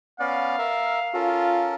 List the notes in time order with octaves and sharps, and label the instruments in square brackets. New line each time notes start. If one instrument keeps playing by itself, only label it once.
[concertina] B3 C#4 D5 [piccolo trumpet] F5
[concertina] A#4 E5
[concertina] C#4 A4 A#4 [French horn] F4